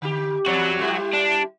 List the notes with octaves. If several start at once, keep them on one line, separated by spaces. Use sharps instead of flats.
D3 G4
E2 F#3 F#4 C5 D5
G3 E4 G4
D4